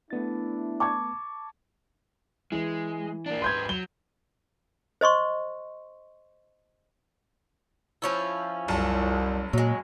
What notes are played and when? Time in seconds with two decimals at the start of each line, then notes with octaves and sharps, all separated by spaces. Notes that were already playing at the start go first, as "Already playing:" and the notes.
0.10 A3 B3 D4 E4 A6
0.80 A5 C#6 D6 G#6
2.52 E3 G#3
3.26 A#3 D4
3.42 G#2 B4 C6 G6 G#6
3.69 F#3 G7
5.01 C5 D#5 C6 C#6
8.02 F3 C#4 E4
8.68 F#1 C2 A5
9.53 A#2 F#3 G#3